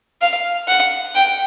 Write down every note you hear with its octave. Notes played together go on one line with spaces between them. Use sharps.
F5
F#5
G5